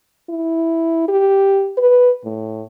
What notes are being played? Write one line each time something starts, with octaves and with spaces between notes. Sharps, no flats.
E4
G4
B4
A2